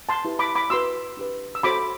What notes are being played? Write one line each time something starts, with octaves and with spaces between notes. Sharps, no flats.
A5 C6
E4 G4 B4
B5 D6
B5 D6
F#4 B4 C6 E6
D4 G4 B4
E6
F#4 A4 C5 B5 D6